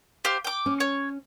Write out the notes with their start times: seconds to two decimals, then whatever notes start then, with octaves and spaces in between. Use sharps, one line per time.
0.25 G4 C5 F5
0.45 G5 D6
0.66 C#4
0.80 C#5